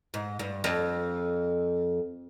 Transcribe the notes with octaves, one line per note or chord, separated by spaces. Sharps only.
G#2
G2
F2